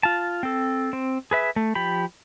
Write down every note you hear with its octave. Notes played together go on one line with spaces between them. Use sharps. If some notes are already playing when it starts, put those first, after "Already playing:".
F4 A5
C4 A4
C4
G#4 B4 E5
A3
F3 G4 B5